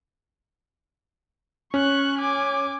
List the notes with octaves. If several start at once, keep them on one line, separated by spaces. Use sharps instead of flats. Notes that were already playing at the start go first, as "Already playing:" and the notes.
C#4 C#6 F#6
G#5 D6